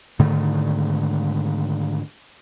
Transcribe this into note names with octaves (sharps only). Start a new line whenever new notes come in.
G#2 D3 D#3 A3